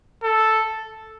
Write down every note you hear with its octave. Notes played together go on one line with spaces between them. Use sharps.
A4